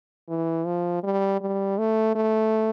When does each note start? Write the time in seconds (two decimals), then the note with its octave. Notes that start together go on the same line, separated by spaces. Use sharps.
0.29 E3
0.66 F3
1.03 G3
1.41 G3
1.78 A3
2.15 A3